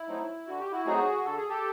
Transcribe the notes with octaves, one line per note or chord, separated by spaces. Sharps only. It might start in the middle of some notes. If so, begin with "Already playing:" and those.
Already playing: E4
F#3 A3 C4 D#4
D3 F#4
G4
E4 F#4
F#3 A3 C4 D#4 F#4 G#4
D3 A4
G#4
G4 A4